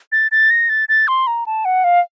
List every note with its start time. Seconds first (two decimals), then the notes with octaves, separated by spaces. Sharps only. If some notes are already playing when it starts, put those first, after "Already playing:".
0.12 A6
0.32 A6
0.51 A#6
0.69 A6
0.89 A6
1.08 C6
1.27 A#5
1.46 A5
1.65 F#5
1.84 F5